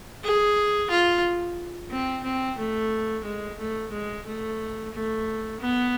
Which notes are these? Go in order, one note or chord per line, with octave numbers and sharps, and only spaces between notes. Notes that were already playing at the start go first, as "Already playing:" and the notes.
G#4
F4
C4
C4
A3
G#3
A3
G#3
A3
A3
B3